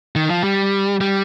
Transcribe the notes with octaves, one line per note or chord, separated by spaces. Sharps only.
D#3
F3
G3
G3